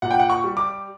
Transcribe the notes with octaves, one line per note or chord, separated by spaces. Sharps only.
A#2 F#5
G5
F#5
C#6
G3
D6